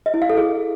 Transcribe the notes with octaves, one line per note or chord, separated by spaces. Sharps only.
D#5
E4
F5
A4
G#4